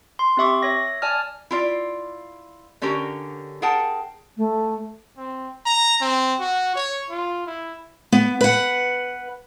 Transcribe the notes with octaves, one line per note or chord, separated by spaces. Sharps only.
C6
C4 G4 E5 C#6 D6
C#5 E5 A#6
D5 G#5 A5 F6
E4 F4 D5
D3 C#4 F#4 G4 A#4
G#4 A#4 F#5 G5 A5
A3
C4
A#5
C4
F#4
C#5
F4
E4
B3
B4 F#5